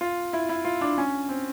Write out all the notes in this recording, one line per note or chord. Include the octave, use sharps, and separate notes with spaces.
F4
E4
E4
F4
D4
C#4
C4